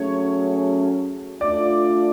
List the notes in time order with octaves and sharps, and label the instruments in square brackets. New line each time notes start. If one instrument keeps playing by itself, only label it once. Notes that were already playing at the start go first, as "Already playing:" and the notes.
Already playing: [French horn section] F#3 A3 C#4 G#4 [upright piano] C#5
[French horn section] A3 D4 F4 [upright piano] D5